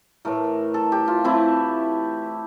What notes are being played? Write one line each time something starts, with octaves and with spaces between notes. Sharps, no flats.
A2 E3 A3 A#4
A4
G4
F4
E3 A3 C4 E4